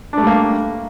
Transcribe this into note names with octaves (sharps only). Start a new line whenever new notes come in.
G3 A3 A#3 D4